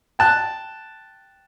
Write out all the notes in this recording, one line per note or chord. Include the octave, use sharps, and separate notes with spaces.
G5 A5 F#6